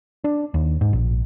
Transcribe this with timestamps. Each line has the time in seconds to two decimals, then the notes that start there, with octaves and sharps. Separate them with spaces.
0.24 D4
0.54 D#2
0.81 G#2
0.93 A#1